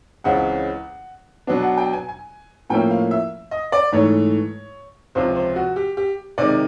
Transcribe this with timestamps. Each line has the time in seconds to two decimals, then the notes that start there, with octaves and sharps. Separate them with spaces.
0.24 C#2 C#3 E3 G#3 C4 F#5
1.47 B2 F#3 B3 D4
1.63 F#5
1.78 G5
1.93 G#5
2.08 G#5
2.70 A2 F3 A#3 C#4 E4 G5
2.90 F5
3.11 E5
3.51 D#5
3.72 D5
3.92 G#2 E3 A3 C#5
5.15 C#2 C3 F3 C5
5.36 C5
5.56 F#4
5.76 G4
5.97 G4
6.38 C3 D#3 G#3 D5